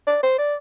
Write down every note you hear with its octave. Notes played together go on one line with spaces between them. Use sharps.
D5
C5
D5